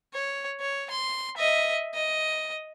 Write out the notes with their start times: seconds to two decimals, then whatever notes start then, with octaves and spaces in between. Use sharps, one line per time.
0.14 C#5
0.60 C#5
0.90 C6
1.37 D#5 E5
1.94 D#5